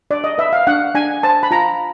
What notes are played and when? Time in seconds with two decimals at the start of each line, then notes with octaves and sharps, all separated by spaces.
0.10 D4 D5
0.24 D#5
0.38 B4 E5
0.53 F5
0.67 D4 F#5
0.95 D4 G#5
1.23 C5 A5
1.43 B5
1.51 F4 A#5